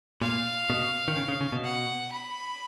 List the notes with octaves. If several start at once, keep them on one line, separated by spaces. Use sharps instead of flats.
A#2 F5
B2
D#3
C#3
C#3
C#3
B2
F#5
B5